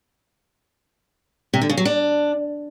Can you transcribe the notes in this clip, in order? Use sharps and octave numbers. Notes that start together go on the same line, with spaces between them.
C3
D3
C#3
F#3
D4